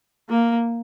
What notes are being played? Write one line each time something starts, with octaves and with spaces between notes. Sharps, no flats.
A#3